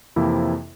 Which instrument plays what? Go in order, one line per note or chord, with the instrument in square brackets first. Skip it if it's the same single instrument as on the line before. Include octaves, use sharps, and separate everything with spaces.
[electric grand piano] F2 C3 E3 A#3 E4